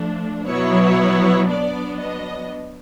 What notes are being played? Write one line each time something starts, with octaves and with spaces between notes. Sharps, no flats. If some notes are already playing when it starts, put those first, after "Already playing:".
Already playing: F3 A3 D4
B2 F#3 B3 E4 C#5
F#3 B3 D4 D5
D#5